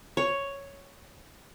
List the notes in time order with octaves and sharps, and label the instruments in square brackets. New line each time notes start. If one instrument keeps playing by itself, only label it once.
[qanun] C#5